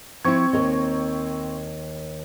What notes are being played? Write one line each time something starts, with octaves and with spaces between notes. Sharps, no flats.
F3 C4 E4 C#6 G#6
D#2 A#4 D#5